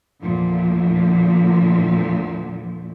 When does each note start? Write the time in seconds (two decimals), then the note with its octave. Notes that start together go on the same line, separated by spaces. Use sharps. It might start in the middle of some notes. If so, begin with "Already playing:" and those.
0.21 E2 A#2 D3 F3